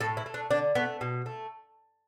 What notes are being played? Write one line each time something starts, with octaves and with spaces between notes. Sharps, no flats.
A2 A4
E4
A3
D4
D3 D4
A3 B3
B2
A3